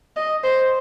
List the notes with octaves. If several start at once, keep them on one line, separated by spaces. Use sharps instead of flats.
D#5
C5